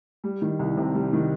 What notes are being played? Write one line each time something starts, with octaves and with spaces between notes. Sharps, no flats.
G3
D#3
C2
C3
G3
D#3